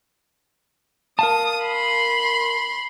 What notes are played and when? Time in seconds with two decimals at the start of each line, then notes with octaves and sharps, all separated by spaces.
1.19 A#4 F5 A5 D#6
1.65 B5 C6